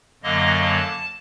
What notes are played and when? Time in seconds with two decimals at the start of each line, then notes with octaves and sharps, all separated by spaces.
0.23 F#2 D3 F#3 A#3 D#5
0.64 A5